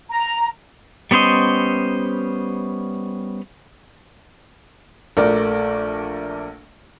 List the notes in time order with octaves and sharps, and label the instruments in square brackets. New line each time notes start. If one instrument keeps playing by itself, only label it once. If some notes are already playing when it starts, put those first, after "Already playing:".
[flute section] A#5
[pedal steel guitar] G3 B3 C#4 C5 D#5
[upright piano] A#1 A3 A#4 D5